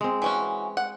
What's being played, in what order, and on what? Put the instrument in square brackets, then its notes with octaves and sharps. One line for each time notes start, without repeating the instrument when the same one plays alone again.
[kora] G#3 C4
[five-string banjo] E3 C#4 F#4
F#5